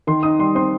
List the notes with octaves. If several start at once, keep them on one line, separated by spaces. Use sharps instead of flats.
D#3 C6
D#4 D#6
G3 C6
C4 C6